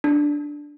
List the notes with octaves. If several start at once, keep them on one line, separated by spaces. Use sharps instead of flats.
D4